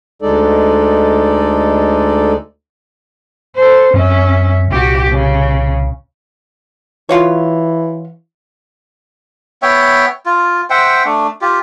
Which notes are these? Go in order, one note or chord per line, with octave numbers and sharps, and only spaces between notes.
D2 G#3 D#4 A4 D5
A4 C5
F#2 C4 C#4 E5
C2 A#2 F#4 G4
C#3
E3 F4 F#4 C#5
B3 C#5 E5 G5
F4
C5 E5 F#5 G5
A3 D4
F4 G4